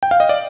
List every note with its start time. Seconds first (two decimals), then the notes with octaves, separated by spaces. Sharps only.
0.03 G5
0.11 F5
0.20 D#5
0.29 D5